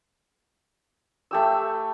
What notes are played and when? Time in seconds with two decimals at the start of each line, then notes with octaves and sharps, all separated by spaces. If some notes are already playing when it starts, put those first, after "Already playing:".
1.31 A3 G4 E6